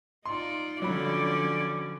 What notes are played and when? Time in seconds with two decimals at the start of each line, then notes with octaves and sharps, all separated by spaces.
0.26 D#4 F4 D5 C6
0.82 D3 F3 F#3 C#4 D5 B5